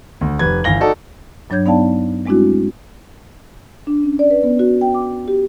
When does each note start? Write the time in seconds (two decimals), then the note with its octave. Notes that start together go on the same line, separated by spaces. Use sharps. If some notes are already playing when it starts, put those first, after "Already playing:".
0.21 D2
0.39 F1 B4 G#6
0.64 G1 E3 F5 A#6 G7
0.80 D#4 F#4 A4 D5
1.50 G2 F#3 D4 C#5 G6 G#6
1.66 B3 D#4 D5 F5 G5 A5
2.26 G3 G#3 C4 D4 E4 F#4
3.87 D4
4.03 C#4
4.19 D5
4.31 B4
4.44 B3
4.59 F#4
4.81 G5
4.94 D6
5.28 G4